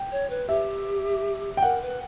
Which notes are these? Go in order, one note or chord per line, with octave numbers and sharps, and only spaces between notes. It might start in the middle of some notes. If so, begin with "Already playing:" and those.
Already playing: G5
C#5
B4
G4 E5
G5
A#4 F#5
B4